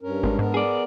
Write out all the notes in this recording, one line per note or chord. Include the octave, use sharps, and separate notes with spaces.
G2 C#4 A#4
G#1 G#3 A#3 D4
G#2 B3 A#4
G#4 D5